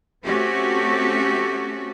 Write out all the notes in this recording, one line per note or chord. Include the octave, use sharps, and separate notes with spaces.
A3 C4 C#4 F#4 G4